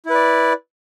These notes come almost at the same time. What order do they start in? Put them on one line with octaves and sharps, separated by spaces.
E4 B4 D5